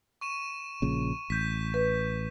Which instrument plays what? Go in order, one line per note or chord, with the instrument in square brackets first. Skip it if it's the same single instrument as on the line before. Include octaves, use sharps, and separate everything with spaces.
[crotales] C#6 D#7 E7
[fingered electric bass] A#1 A#2 C#3
[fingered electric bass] A1 [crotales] G6 B6
[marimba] B4